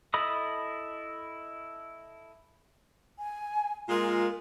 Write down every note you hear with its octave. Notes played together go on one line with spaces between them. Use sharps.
E4 A4 D#5 B5 D#6
G#5
A#2 G#3 F4 A#4